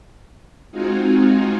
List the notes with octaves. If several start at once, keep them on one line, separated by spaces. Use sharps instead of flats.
G#3 C4 D#4 F4 F#4 G#4